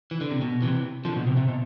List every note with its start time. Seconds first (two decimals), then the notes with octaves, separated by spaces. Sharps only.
0.11 E3
0.21 D3
0.31 C3
0.42 B2
0.62 C3 E3
1.05 D3 F3
1.16 B2
1.27 C3
1.37 C3
1.49 B2